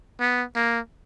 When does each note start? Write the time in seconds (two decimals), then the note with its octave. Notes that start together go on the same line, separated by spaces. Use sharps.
0.20 B3
0.55 A#3